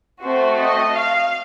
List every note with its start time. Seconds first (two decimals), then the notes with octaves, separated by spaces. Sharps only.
0.23 A3 C4 F#4 C5
0.59 D#5
0.95 F5